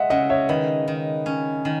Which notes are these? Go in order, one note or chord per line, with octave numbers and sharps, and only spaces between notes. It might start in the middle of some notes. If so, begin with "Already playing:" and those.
Already playing: G#3 D#5 E5 F#5
C#3 D#5 F#5
C#5 E5
D#3 B4 D#5
D#3
C#4
D#3